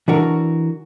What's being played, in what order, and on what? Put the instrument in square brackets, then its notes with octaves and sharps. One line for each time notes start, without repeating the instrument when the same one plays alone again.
[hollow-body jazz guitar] E3 D4 F#4 A#4